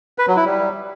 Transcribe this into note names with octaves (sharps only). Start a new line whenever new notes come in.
B4
F#3
E4
G3